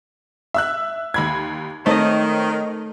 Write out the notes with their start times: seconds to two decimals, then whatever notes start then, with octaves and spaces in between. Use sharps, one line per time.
0.54 E5 E6 F#6
1.14 D#2 B5 G#6
1.86 D#3 A3 C4 D#4 C#5 D#5